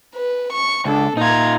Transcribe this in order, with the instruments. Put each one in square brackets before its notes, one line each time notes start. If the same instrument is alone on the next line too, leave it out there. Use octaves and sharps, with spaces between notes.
[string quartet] B4
C#6
[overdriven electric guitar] C#2 [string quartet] D4 A4
[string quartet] A#2 A#5 G#6 [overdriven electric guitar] D#4 F4